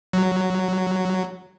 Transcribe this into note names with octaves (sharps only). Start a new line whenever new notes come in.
F#3